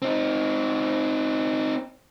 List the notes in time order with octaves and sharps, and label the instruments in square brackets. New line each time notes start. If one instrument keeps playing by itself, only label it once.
[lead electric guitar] C4 D#4